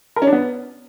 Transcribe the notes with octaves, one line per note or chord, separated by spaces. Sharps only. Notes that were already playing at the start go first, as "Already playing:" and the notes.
A#4
C#4
D4
B3